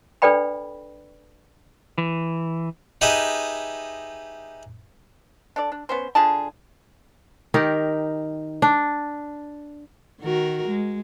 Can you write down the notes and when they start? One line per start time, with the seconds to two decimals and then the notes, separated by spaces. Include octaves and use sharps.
0.22 D4 A4 B4 D5 G5 B5
1.98 E3
3.01 D#4 G4 G#4 B4 D#5 E5
5.56 D4 A4 D5
5.72 D4
5.89 B3 C#4 C5
6.15 D3 F4 G#4 A5
7.54 D#3 D#4 G4 A#4
8.62 D4
10.22 D#3 F#4 A#4
10.68 G#3